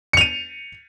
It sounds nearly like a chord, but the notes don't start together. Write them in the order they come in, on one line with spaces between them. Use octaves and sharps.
C#7 F7 D#7